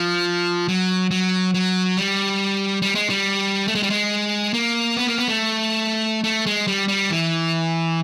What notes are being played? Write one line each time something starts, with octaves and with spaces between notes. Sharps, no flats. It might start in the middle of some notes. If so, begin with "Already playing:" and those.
Already playing: F3
F#3
F#3
F#3
G3
G3
G#3
G3
A3
G#3
G3
G#3
A#3
B3
A#3
B3
A3
A3
G#3
G3
G3
E3